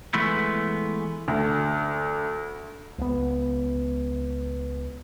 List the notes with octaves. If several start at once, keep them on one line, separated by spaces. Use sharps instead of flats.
E3 G#3 A3 B3
D2
C#2 B3